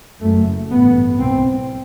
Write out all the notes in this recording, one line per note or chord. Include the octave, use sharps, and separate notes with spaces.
F#1 F#2 A3
A1 G2 B3
C2 C3 C4